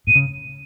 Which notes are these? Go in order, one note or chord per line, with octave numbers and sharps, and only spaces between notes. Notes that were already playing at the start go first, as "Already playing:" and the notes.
A2 D#7
C#3